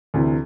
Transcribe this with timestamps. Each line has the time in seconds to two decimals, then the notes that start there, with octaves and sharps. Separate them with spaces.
0.14 D2 C3 E3